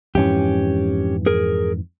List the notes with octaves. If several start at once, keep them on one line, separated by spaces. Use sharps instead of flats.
F2 G#2 E3 C#4 G4
G#4 A#4